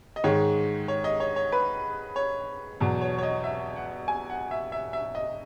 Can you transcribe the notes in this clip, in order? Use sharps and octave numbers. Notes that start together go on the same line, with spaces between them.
D#5
G#2 D#3 G#3 C#5
C#5
D#5
C#5
C#5
B4
C#5
E2 B2 F#3
C#5
C#5
D#5
E5
F#5
G#5
F#5
E5
E5
E5
D#5